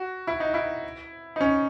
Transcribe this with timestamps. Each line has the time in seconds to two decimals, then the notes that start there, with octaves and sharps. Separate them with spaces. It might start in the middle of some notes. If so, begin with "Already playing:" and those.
Already playing: F#4
0.27 E4
0.40 D#4
0.54 E4
1.36 D#4
1.41 C#4